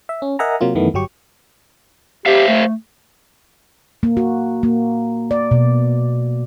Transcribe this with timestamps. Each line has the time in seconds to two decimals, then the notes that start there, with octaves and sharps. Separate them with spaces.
0.09 E5
0.22 C#4
0.39 A#4 D#5 E5 F#5 G#5 A#5
0.61 C3 F#3 A#3 F4
0.75 F#2 D#3 E3 A3 B3
0.94 G1 F#3 G4 C#6
2.26 G4 C5 E5 F5
2.49 A3
4.03 A#3
4.17 F#4
4.63 A#3
5.31 D5
5.51 B2